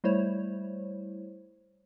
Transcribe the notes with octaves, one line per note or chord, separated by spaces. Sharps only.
G3 A3 E4 C5 C#5